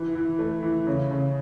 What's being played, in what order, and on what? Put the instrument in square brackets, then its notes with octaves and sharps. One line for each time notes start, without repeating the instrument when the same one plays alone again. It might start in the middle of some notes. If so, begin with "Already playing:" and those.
Already playing: [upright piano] E3
E3
A3
E3
C#3
C#3